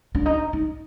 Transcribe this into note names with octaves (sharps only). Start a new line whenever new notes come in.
D4
D#4
D#4